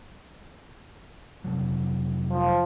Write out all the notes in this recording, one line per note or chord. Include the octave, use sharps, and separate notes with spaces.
F1 C3 F#3
F3